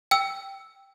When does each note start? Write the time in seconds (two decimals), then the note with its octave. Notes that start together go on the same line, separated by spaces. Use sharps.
0.11 G5 E6